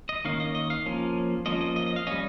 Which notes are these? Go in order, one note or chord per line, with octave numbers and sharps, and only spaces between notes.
D#5
D#3 A#3 C#4 F5
D#5
D#5
F5
F3 A#3 C#4
F3 A#3 C#4 D#5
D#5
D#5
D#5
F5
G3 C#4 D#5